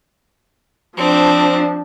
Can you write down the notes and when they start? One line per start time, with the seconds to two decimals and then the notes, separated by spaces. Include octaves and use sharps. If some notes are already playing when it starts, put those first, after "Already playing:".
0.97 F3 C4 D4